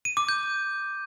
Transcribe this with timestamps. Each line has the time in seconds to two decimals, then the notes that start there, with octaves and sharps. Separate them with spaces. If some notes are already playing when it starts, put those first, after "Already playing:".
0.05 D#7
0.17 D6
0.29 G6